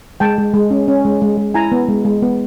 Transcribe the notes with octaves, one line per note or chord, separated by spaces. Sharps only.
G#3 G5 A5
G#3
G#3
C#4
C#4
G#3
G#3
G#3
E4 G#5 A#5
B3
G#3
G#3
B3